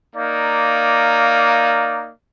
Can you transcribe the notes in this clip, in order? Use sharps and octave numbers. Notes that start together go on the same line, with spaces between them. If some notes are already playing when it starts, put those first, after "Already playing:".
A#3 D#4 D5 F5